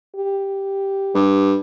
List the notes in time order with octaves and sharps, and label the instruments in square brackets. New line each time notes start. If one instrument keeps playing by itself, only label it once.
[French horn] G4
[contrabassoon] G2